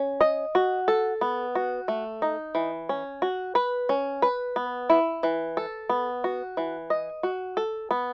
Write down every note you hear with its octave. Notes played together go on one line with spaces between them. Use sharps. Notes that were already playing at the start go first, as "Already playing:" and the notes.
Already playing: C#4
D#5
F#4
A4
B3
F#4
A3
D#4
E3
C#4
F#4
B4
C#4
B4
B3
E4
E3
A4
B3
F#4
E3
D#5
F#4
A4
B3